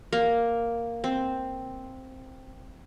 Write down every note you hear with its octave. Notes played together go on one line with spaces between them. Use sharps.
A#3
C4